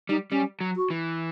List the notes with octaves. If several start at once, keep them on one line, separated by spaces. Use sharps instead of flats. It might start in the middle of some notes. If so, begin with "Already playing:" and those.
G3 D#4
G3 C#4
F#3
F#4
E3